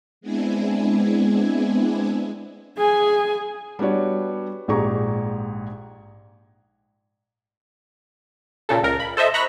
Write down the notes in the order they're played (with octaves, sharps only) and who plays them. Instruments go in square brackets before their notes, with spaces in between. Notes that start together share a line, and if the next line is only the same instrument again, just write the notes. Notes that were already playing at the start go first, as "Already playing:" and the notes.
[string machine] G#3 B3 C4 D4 E4 G#5
[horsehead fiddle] G#4 G#5
[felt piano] G3 B3 D4 F#4 C#5 D5
A#1 G#2 G4 G#4 A#5 C#6
[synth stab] A#2 C#3 A4
C#2 A#4
B5
A4 C5 D#5 E5
A#5 B5 C#6 F#6 A#6 B6